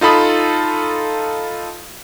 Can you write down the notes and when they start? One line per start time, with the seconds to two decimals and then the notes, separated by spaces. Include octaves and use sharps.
0.01 D#4 F4 A4 B5 D#6